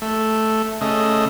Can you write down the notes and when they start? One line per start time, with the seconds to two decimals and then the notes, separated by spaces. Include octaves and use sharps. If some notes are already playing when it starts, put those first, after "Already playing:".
0.02 A3
0.81 C#3 A3 D#5